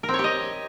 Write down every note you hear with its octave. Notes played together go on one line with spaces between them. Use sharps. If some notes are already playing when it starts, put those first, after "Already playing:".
A#4
C4
C#5
G4
D#5